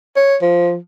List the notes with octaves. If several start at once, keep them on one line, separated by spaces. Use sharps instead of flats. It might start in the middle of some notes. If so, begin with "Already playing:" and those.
C#5
F3